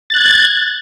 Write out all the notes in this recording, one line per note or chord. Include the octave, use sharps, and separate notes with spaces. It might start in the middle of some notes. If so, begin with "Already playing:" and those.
F#6 G#6 A6